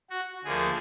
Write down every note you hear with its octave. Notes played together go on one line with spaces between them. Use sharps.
F#4
D2 D3 F3 A#3 G#4